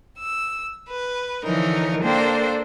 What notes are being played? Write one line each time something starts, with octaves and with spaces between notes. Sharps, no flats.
E6
B4
D3 E3 F3 D#4 A#4 C#5
A#3 D4 A4 C5 G5